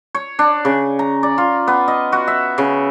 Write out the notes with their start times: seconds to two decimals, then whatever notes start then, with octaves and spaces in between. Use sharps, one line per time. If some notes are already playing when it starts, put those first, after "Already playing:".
0.15 C#5
0.39 D4
0.65 C#3
0.99 A#5
1.23 D5
1.38 F4
1.67 B3
1.88 D#5
2.12 F#4
2.28 E5
2.58 C#3